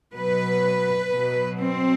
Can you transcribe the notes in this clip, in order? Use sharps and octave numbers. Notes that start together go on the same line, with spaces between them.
B2 F#3 B4
B2 F#3
C4